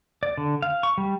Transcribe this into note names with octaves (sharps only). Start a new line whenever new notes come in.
D5
D3
F5
C#6
G3